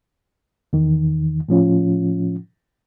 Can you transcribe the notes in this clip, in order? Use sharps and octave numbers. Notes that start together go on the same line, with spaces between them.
E2 D#3
A2 F3 C#4 F4